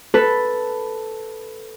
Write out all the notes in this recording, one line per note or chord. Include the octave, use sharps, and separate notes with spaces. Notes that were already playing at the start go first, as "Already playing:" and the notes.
A4 B4